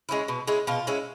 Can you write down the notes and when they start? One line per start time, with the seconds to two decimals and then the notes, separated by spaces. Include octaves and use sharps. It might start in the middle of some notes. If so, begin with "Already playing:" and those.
0.09 G#3 C#4 E4
0.28 B2
0.47 G#3 C#4 E4
0.67 B2 F4
0.87 G#3 C#4 E4